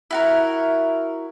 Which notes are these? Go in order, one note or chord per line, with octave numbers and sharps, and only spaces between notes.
E4 F#4 A#4